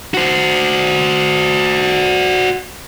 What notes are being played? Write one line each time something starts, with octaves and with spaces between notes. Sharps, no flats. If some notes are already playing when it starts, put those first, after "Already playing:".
F#4 C5